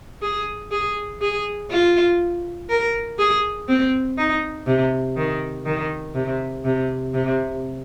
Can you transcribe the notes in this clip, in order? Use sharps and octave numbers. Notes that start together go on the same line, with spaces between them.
G#4
G#4
G#4
F4
A#4
G#4
C4
D#4
C3
D#3
D#3
C3
C3
C3